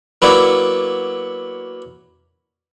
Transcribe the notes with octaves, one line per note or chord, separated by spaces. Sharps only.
F#3 A#3 B3 E4 D5